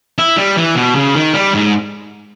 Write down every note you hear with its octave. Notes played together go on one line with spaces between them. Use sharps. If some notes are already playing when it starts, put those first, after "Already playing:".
E4
G3
E3
B2
C#3
D#3
G3
G#2